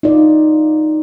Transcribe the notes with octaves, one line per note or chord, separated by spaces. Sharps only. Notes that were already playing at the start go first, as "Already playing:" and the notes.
D#4 F4 D5